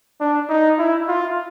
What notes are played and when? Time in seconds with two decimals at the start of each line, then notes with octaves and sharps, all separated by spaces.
0.21 D4
0.49 D#4
0.78 E4
1.08 F4